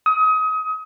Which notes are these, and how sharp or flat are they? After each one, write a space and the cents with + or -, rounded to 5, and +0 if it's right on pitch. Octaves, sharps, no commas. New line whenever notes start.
D#6 +30